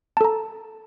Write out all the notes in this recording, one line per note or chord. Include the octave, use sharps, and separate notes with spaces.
A4 A5 A#5